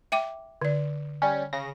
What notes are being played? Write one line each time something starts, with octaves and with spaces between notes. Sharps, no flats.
E5 G5 D6
D3 D5
G3 C#4
C#3 A#6